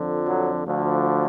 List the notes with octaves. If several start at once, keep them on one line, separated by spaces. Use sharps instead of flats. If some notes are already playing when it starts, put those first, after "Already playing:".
Already playing: F2 D3 F3
F#3
D2 D3 F3